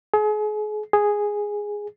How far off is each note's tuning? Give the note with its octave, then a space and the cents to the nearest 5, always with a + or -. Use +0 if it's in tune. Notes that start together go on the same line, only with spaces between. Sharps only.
G#4 +35
G#4 -5